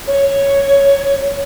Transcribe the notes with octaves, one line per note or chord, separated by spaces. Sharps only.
C#5